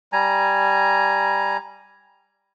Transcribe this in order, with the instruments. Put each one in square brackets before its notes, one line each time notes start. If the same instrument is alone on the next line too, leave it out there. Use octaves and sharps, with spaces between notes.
[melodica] G3 G#5 A#5